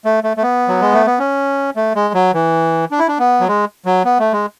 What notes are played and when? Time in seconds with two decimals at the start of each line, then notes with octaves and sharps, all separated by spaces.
0.05 A3
0.24 A3
0.37 A3
0.42 B3
0.68 F#3
0.81 G#3
0.94 A3
1.06 B3
1.19 C#4
1.76 A3
1.95 G#3
2.14 F#3
2.34 E3
2.91 D4
2.99 E4
3.08 D4
3.19 B3
3.40 F#3
3.48 G#3
3.86 F#3
4.05 B3
4.19 A3
4.33 G#3